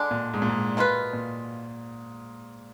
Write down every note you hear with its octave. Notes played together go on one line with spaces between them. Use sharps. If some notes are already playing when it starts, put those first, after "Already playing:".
Already playing: D3 G#3 D4
A#2
G#2
A#2
G#2
B2 A#3 F4 B4
A#2